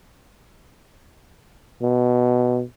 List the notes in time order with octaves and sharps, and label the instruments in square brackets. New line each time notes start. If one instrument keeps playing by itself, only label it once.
[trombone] B2